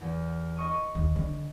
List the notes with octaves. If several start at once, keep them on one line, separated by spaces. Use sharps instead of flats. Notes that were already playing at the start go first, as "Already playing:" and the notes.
E2
D#5 C#6 D#6
D#2
D3